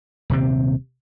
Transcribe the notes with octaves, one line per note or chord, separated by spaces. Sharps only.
D#1 C3 C4